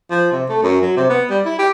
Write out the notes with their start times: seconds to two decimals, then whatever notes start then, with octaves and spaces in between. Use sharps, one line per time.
0.11 F3
0.32 C3
0.49 A3
0.63 F#2
0.82 F#3
0.97 C3
1.10 B3
1.30 G3
1.45 E4
1.59 G4